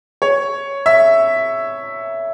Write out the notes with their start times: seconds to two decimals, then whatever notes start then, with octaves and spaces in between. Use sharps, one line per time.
0.22 C#5
0.86 E5